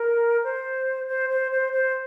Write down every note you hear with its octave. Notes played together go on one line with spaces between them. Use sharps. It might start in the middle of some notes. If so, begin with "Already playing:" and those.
Already playing: A#4
C5
C5
C5
C5
C5